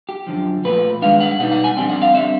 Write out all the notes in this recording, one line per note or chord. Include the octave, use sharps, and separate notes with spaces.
G4
F#2 D3 F3
A#2 F3 A3 B4
G2 D#3 G#3 B3 D4 F5
F#5
B2 G3 B3 D#4 F#5
F#5
G#5
F2 D3 G3 C4 G5
F#5
F5
D3 G3 C4 E5